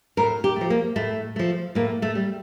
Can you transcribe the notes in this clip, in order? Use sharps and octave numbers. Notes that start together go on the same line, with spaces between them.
A2 A#4
G4
F3 A3
A#3
A2 A3
F3 A3
A2 A#3
A3
G3